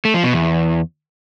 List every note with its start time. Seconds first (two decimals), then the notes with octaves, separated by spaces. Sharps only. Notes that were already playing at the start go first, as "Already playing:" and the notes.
0.05 A3
0.14 F3
0.24 B2
0.33 E2